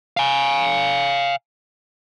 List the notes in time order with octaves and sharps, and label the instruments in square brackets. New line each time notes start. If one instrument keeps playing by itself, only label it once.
[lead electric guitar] F5 G#5